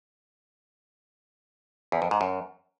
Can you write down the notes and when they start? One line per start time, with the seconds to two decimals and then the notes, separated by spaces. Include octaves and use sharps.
1.92 E2
2.02 F2
2.11 G#2
2.21 F#2